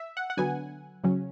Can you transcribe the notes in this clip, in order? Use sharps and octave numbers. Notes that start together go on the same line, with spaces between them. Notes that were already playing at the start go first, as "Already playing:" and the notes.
Already playing: E5
F#5
F#5
D3 F#3 B3 G#5
C#3 F#3 C#4